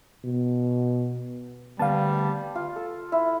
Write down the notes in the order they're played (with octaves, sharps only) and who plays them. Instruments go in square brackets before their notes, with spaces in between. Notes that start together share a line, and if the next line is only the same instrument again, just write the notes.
[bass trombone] B2
[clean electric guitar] D2 B3 [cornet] G3 [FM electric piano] F5 A5
[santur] F4
A4
E4